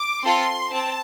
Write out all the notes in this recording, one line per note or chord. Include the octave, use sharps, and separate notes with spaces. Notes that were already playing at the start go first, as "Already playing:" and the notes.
Already playing: D6
C4 F4 A4 C6
C4 A5